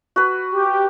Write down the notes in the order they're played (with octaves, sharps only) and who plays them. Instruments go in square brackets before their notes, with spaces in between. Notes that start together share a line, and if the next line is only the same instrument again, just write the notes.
[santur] F#4 B4
[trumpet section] G4